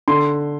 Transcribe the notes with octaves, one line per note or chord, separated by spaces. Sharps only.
D3 C6